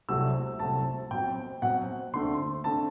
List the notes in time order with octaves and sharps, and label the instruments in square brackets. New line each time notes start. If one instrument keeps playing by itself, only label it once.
[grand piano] C2 C3 F#3 A3 C4 E6
C2 C3 F#3 A3 C4 A5
B2 F#3 C4 G5
B2 F#3 C4 F#5
D2 D3 A3 C4 C6
D3 A3 C4 A5